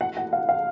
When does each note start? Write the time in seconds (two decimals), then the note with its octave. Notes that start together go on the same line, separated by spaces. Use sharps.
0.01 F#5
0.17 F#5
0.33 F5
0.49 F5